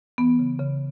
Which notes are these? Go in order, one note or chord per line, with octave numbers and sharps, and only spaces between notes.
E3 B3
C#3
C#3